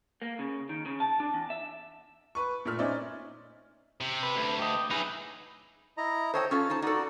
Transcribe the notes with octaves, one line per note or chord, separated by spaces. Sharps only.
A#3
C#3
D#3
C#3
A5
D4
E2
E5
B4 C#6
A#2 A3 E5 F6
C#4 D#4 C5 D5 E5
C3
B4
D2
G4 D#5
F#3 D#4 E4 G#4 B4
E4 D#5 A#5
A4 C5 C#5 D#5 G5
C#4 F4 A4 F6
D#4 C5 A5
D#4 F#4 A4 D5